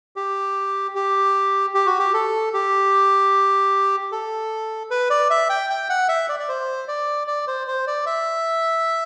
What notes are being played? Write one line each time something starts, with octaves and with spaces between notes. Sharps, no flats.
G4
G4
G4
F#4
G4
A4
G4
A4
B4
D5
E5
G5
G5
F#5
E5
D5
D5
C5
D5
D5
C5
C5
D5
E5